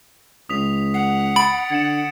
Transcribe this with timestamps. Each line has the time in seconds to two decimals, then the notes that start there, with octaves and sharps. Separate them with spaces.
0.49 C#2 D#6 B6 F7
0.94 F#5 C7
1.36 B5 A6 D7 F#7
1.71 D3 G#6 C#7 E7